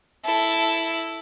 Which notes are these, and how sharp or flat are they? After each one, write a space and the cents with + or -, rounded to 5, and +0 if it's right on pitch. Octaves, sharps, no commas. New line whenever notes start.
E4 +0 A4 +0